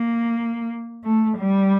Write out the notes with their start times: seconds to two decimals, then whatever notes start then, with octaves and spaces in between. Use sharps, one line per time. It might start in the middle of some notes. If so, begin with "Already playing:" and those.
Already playing: A#3
1.04 A3
1.37 G3